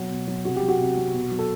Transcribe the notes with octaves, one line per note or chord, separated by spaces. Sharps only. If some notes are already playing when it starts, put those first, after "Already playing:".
Already playing: B2 F#3
B2
F#3
C3 F#4
G4
F#3
F#4
C3
F#3
B2
F#3
A4